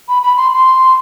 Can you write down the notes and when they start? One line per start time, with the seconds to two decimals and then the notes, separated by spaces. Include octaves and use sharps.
0.08 B5
0.23 B5
0.37 C6
0.53 C6